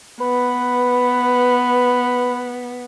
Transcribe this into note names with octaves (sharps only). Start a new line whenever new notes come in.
B3 B4